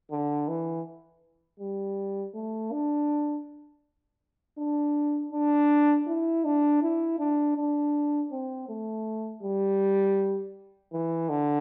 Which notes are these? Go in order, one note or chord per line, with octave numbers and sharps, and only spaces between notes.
D3
E3
G3
A3
D4
D4
D4
E4
D4
E4
D4
D4
C4
A3
G3
E3
D3